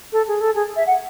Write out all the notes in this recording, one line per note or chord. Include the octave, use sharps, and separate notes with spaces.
A4
G#4
A4
G#4
E5
F#5